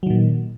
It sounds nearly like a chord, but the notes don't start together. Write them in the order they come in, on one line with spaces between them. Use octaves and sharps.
F#3 D#3 A#2